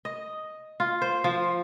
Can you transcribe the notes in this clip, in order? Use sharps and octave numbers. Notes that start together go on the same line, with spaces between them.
D#5
F4
C5
F3